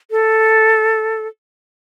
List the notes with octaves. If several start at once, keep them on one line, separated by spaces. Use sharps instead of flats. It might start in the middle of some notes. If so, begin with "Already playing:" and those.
A4